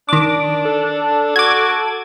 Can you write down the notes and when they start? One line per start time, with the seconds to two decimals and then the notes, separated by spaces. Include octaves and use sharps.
0.09 D#3 D4 D6
0.65 A4
1.36 F#4 D6 G#6